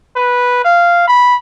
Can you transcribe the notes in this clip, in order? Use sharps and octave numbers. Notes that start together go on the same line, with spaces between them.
B4
F5
B5